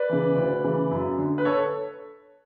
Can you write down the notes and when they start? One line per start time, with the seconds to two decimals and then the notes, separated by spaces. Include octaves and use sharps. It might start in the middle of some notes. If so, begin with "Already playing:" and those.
Already playing: B4 D5
0.09 C#3 E3
0.36 D2
0.64 C#3 E3
0.91 F#2
1.18 D3
1.38 B4
1.45 A4 C#5